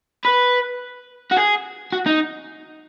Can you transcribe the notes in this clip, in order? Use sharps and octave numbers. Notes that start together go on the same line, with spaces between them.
B4
F#4
G#4
F#4
D#4